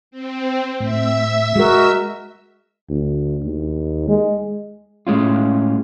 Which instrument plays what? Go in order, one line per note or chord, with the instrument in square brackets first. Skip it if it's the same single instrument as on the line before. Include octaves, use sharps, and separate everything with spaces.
[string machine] C4
[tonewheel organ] A2 [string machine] E5 E6
[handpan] G#3 A#4 [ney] F#4
[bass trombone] D2
D#2
G#3
[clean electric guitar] A2 G#3 C#4 F4